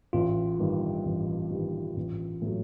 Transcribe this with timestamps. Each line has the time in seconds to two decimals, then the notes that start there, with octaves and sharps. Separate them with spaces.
0.13 A1 F4
0.59 G2 D#3 G3
1.05 A1
1.50 G2 D#3 G3
1.97 A1
2.42 A2 F#3